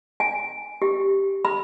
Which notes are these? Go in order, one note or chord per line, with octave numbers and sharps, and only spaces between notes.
G#5
G4
B5